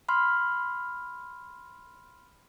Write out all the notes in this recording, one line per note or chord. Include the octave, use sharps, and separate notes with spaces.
B5 C6 F6